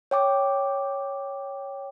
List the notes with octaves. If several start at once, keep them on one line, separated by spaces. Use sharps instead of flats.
C#5 G5 D6